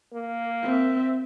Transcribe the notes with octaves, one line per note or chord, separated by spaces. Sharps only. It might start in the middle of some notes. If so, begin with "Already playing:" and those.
A#3
C4 E5